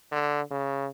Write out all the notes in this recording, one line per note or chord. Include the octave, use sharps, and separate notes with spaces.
D3
C#3